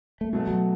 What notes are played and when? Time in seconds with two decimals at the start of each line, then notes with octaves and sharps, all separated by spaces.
0.21 A3
0.33 B2 F#3 G#3 A3
0.47 F#3